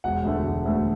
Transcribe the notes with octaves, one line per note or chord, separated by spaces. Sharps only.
E1 F#5
D2 D3 A3
E1
D2 D3 A3